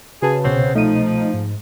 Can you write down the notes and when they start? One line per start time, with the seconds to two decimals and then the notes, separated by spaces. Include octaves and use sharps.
0.22 C#3 F#4 G#4 B4 A5
0.45 C2 B2 B3 C4 C5 C#5
0.75 F3 A3 D#4 D#7
1.34 G#2